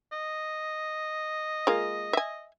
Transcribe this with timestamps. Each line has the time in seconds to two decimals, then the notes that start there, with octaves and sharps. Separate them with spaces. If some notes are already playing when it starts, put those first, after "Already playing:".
0.12 D#5
1.67 G#3 A#3 F4
2.13 E5 G#5